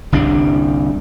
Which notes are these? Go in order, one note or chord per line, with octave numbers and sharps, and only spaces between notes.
G1 C2 G3 D4